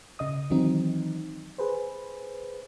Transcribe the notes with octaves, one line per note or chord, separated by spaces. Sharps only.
C#3 D#5 D#6
D#3 E3 F#3 C4 D#4
G#4 B4 C5